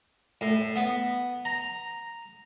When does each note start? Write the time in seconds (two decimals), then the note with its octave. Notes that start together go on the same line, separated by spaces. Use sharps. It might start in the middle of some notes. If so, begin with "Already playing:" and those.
0.41 A2
0.76 B3
1.45 A#5